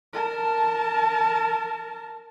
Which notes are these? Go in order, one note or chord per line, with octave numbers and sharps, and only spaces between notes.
A#4 A5